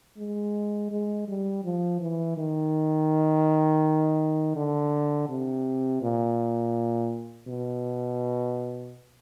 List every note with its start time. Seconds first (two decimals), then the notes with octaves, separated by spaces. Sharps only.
0.18 G#3
0.91 G#3
1.28 G3
1.64 F3
2.01 E3
2.37 D#3
4.56 D3
5.29 C3
6.02 A#2
7.48 B2